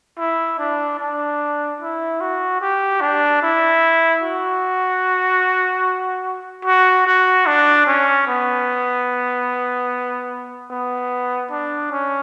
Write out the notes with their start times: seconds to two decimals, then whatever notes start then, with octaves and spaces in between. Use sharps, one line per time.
0.19 E4
0.59 D4
1.00 D4
1.81 E4
2.21 F#4
2.61 G4
3.01 D4
3.43 E4
4.23 F#4
6.65 F#4
7.07 F#4
7.46 D4
7.87 C#4
8.28 B3
10.71 B3
11.51 D4
11.92 C#4